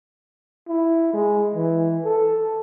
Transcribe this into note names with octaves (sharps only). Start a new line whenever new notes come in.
E4
G#3
E3
A4